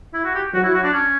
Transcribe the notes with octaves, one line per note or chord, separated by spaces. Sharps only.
E4
F#4
G4
F#3 F#4
E4
F#4
D4
C#4